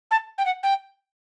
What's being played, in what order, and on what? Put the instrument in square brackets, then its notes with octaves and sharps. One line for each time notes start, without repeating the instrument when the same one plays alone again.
[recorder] A5
G5
F#5
G5